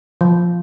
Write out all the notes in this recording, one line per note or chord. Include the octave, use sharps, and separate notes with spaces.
F3